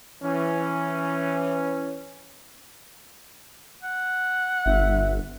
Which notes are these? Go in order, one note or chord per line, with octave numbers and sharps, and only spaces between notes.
E3 C#4
F#5
G1 E5